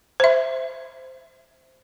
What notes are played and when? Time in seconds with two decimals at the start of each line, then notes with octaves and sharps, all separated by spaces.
0.20 C5 E5